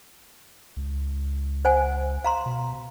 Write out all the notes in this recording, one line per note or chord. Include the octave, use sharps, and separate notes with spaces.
C#2
C5 F#5 G#5
F5 A#5 C6
B2